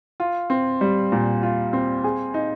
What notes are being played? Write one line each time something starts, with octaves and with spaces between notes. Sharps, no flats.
F4
C4
G3
A#2
F4
C4
G#4
D#4